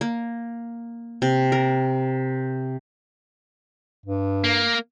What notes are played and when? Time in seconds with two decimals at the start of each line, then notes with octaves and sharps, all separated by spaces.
0.01 A#3
1.22 C3
1.52 A#4
4.05 G2
4.44 A#3